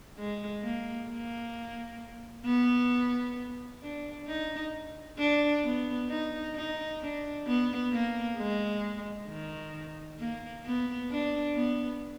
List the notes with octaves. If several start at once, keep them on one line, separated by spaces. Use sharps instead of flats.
G#3
A#3
A#3
B3
D4
D#4
D4
B3
D#4
D#4
D4
B3
A#3
G#3
D#3
A#3
B3
D4
B3